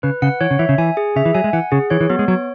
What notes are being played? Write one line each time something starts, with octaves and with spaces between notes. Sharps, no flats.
C#3 B4
C#3 F#5
E3 C#5
C#3
E3 E5
C#3
E3 G#5
G#4
C#3 E5
E3
F#3 G#5
G#3
E3 F#5
C#3 G#4
E3 C#5
E3
F#3 B3
G#3
F#3 C#5